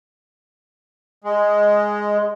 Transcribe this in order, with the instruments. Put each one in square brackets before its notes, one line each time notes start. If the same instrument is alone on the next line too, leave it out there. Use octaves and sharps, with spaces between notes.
[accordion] G#3